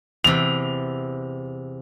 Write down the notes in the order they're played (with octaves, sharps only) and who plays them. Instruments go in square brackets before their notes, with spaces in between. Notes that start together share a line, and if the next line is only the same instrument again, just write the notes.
[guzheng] E2 C3 [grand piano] F7